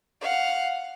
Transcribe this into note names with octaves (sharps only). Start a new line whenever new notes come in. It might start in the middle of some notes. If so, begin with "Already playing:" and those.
F5 F#5